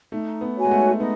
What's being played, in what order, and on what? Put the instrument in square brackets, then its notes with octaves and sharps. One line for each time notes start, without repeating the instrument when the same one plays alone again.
[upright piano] A3 [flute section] D#4
[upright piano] B3
[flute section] F#4 C#5 G#5
[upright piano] G#3
A3
[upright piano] B3 [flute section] D#4